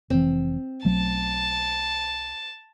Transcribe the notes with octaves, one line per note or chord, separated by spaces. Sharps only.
F1 E3 C4
B1 F#3 A3 A5